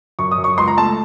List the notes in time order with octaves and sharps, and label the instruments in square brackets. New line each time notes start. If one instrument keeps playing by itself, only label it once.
[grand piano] F#2 C#6
D#6
F#2
C#6
C#2 C6
A#5
A3 A5